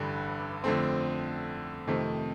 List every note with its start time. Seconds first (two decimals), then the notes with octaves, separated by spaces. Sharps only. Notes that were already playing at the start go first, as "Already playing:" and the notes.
Already playing: A1 G2 D3 G3
0.64 F2 D3 A3 C4
1.87 F2 C3 D#3 A3